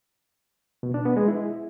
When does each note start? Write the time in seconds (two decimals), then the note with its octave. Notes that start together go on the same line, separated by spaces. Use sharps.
0.83 B2
0.94 D4
1.05 B3
1.17 G#3
1.28 E4